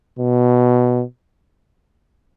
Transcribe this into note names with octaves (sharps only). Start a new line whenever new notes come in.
B2